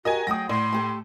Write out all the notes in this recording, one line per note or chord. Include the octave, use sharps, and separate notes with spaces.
F#4 G4 A#4 D#5 G#5
F#3 A3 G#4 G5 D#6 A#6
A2 D5 C6
A3 G4 A4